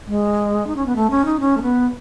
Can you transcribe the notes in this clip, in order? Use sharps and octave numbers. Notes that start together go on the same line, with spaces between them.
G#3
D#4
C#4
B3
A3
C#4
D#4
C#4
A3
B3